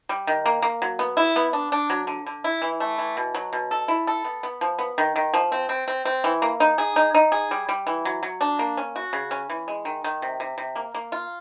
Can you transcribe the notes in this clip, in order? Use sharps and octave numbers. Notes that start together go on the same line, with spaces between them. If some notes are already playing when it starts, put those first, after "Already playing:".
G3
D#3
A#3
A#3
F#3
B3
E4
B3
D4
D4
F#3
D3
D3
E4
E3
A3
E3
B2
F#3
B2
A4
E4
A4
B3
B3
F3
B3
D#3
D#3
F3
C4
C4
C4
C4
E3
A#3
D#4
G#4
D#4
D#4
G#4
G3
G3
E3
F#3
F#3
D4
A#3
C#4
F#4
C#3
C#4
E3
G#3
D#3
D#3
C3
C3
C3
A#3
A#3
F4